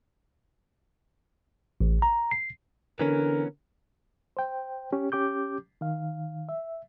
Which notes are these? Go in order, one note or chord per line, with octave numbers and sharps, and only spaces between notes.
A1
A#5
C7
D3 E3 B3 C#4 A#4
C5 G5
C#4 G4
C#4 G4 D6 G6
D#3 F5
E5